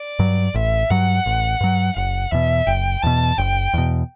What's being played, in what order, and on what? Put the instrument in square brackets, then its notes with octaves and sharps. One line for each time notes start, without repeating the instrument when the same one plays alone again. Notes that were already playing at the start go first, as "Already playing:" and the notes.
Already playing: [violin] D5
[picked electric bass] G2 F#3
[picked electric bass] A1 [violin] E5
[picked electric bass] G2 F#3 [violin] F#5
[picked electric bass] A1
G2 F#3
[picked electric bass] F#1 [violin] F#5
[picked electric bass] E2 B2 [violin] E5
[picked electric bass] F#1 [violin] G5
[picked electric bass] E2 B2 [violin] A5
[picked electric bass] F#1 [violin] G5
[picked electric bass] E2 B2